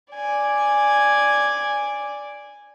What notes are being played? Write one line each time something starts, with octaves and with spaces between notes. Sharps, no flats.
D5 G#5